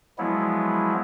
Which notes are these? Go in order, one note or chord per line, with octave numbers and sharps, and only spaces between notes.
F3 F#3 G#3 B3 E4